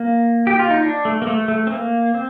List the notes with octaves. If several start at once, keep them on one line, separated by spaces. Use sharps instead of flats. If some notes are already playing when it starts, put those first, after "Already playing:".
Already playing: A#3
G4
F4
D#4
D4
A3
A#3
A3
A3
C4
A#3
C4